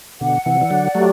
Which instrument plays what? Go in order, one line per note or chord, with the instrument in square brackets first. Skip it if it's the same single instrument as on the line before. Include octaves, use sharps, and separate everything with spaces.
[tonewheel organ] B2 D3 [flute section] F#5
[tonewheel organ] C3 E3
[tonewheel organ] E3 [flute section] D5
[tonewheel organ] D3 F#3
[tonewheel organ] F#3 A3 [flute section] G4